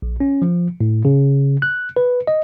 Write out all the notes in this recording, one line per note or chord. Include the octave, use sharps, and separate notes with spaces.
A#1
C#4
F3
A2
C#3
F#6
B4
D#5